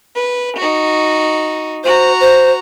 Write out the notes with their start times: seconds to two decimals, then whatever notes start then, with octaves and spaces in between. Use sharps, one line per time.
0.17 B4
0.57 D#4 F#4
1.84 F#4 C5 A#5
2.20 C5